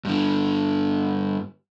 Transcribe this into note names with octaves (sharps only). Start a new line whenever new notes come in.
G2 D3